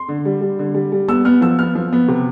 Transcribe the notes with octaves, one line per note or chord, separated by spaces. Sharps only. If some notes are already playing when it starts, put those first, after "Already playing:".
Already playing: C6
D3
G3
G3
D3
G3
G3
B3 E6
B3 F6
F3 E6
B3 F6
F3
B3
C3